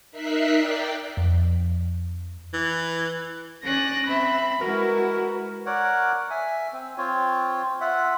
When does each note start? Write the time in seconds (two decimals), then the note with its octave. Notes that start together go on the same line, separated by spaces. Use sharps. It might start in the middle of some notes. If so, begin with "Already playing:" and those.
0.11 D#4 A#4 E5 F#6 B6 C7
0.55 D5 G5
1.17 F2
2.54 E3
3.64 C#4 D5 F#6 A#6
4.07 C4 E5 B5
4.61 G#3 E4 F#4 A#4 B4
5.66 A#4 C#5 D5 F#5
6.30 E5 G#5
6.73 C4
6.98 C4 F4 C#5
7.81 F4 E5 F#5